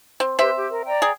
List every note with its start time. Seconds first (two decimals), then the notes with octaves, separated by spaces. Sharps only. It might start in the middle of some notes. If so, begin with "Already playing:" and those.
0.20 C4
0.39 C4 G4 B4 E5 C6
0.56 G4
0.70 A#4
0.86 D5 G5 A#5
1.02 G#4